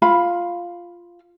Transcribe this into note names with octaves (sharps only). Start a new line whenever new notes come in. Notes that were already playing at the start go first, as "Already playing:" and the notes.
F4 F5 B5